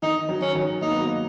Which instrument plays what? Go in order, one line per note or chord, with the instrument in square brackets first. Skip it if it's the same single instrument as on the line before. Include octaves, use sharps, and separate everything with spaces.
[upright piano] D#3 [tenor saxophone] D#4
[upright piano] D#3 F#3
[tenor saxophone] C#4
[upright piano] D#3 F#3
[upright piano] A#3 [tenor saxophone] D#4
[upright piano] B3
F#3 A#3